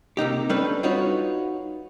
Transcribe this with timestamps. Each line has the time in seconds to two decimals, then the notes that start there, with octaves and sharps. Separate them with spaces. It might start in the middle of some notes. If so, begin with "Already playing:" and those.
0.17 C3 A#3 D#4 G4
0.50 G3 C#4 D4 A4 B4
0.83 D#4 F4 F#4 B4 C#5